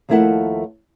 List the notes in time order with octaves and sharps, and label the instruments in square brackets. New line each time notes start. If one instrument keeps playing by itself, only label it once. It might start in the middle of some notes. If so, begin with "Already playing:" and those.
[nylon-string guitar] D#2 F3 A3 E4 A#4 F#5